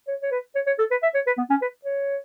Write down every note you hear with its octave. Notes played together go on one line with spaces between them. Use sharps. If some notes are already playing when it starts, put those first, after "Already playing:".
C#5
C#5
B4
C#5
C#5
A4
B4
E5
C#5
B4
B3
C#4
B4
C#5